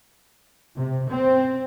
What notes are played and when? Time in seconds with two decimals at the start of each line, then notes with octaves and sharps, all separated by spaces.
0.77 C3
1.09 C4